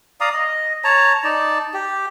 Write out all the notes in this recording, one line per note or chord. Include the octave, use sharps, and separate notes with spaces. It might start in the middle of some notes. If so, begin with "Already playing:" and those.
D5 F5 A#5 D#6
D#5
C#5 A5 A#5
D#4 D5 A5
G4